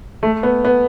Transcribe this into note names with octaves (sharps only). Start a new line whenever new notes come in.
A3
B3
B3